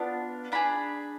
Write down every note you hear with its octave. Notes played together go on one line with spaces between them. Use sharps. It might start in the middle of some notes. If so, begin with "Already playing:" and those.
Already playing: B3 D4 F4
D4 G#4 B5